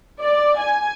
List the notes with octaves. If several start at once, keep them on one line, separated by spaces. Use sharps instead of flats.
D5
G#5